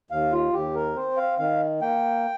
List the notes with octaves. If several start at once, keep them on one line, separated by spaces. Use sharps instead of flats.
D#2 F5
F4
D#2 G4
A#4
C4 C5
F5
D#3 F5
A#3 G5